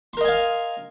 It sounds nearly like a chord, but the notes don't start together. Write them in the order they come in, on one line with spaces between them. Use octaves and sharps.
C6 A#4 D#5 G#5 F5